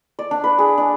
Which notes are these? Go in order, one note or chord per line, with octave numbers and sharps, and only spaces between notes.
D5
D4
B4
G#4
D4